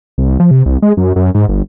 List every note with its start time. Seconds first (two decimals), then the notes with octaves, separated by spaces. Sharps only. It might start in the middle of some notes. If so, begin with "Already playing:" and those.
0.18 C2
0.40 F3
0.51 C3
0.66 C2
0.82 G#3
0.97 F#2
1.16 F#2
1.35 G#2
1.49 G1